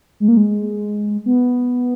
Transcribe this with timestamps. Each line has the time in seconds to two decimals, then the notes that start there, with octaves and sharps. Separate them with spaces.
0.20 G#3
0.28 A#3
0.37 G#3
1.26 B3